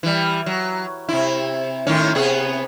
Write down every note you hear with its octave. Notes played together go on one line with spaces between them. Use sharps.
E3 G3
F#3
C3 E4
A2 D#3 C#4
C3 B3 G#4